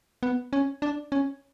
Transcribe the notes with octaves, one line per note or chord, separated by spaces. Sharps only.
B3
C#4
D4
C#4